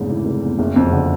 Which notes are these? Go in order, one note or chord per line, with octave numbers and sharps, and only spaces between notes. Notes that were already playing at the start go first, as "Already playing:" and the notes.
Already playing: F1 E2 G#2 C#3
E3
F1
E2
F#1
F2
D3